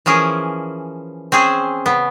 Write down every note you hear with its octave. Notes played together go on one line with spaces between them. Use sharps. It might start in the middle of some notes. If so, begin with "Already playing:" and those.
E3 F3 C#4 G#4 A#4
C4 C#4 G#4 C5
C#3 B3